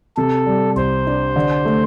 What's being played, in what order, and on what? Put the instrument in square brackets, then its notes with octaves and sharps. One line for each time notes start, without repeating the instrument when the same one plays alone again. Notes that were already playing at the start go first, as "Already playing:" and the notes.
[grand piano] C3 [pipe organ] A4
[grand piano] G3
[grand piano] C2 [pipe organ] C5
[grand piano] D4
D3
A3